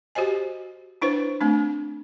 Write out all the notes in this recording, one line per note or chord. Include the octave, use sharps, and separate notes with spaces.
F#4 G4 C5 D#5 G#5
D4 E4 B4 C5
A3 C4 D4